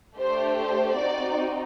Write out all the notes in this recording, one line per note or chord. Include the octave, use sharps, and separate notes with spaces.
A3 D4 G4 C5
C5
C4 D#4 F#4 D5